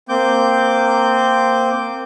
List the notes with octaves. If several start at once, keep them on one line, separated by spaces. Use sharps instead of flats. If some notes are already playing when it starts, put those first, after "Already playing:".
A#3 C4 D6 G6